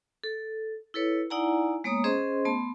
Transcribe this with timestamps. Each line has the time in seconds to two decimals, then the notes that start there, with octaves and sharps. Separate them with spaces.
0.24 A4
0.94 E4 A4 B4 C#5
1.30 D#4 E4 D5 F#5 G#5 A#5
1.84 G#3 A#3 B3 C#5 A#5 D#6
2.04 C#4 G#4 C5 D#5 C6
2.45 A3 B3 A5 C6